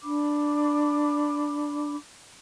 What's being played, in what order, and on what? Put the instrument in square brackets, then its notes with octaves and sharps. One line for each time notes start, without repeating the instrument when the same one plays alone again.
[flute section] D4 B5 D6